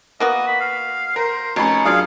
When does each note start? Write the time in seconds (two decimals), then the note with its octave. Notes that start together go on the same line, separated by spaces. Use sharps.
0.20 A#3 B3 F#4 D#5
0.47 B5
0.61 F5
1.16 A#4 C5
1.56 F1 C#4 D#4 C#5 B5
1.85 F#2 D4 F4 G#4 F5